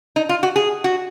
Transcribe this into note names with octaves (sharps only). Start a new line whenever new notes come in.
D#4
F4
F#4
G#4
F#4